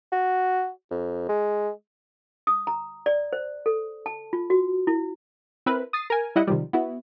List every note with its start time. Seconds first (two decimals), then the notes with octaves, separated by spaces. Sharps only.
0.12 F#4
0.91 F2
1.29 G#3
2.47 D#6
2.67 A#5
3.06 D5
3.33 C5
3.66 A4
4.06 A5
4.33 F4
4.50 F#4
4.87 E4
5.66 C4 E4 A#4 B4
5.93 D#6 A6 C7
6.10 A#4 G#5
6.36 G3 E4 D#5 F#5
6.47 C3 D#3 F3 G3
6.73 B3 E4 F#4